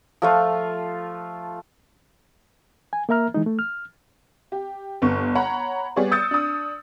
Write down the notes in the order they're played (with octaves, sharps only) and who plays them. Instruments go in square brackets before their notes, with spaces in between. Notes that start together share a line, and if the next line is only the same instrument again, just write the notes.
[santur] F3 A3 F4
[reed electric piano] G#5
A#3 A#4 E5 A#5 F6
E3 G#3 D#4
A3
F6
[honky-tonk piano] G4
G1 B3 C#6
C#5 F#5 A#5 B5
G3 B3 G#4 C#5 D5
D#6 E6 G6 A6 C#7
D4 D#6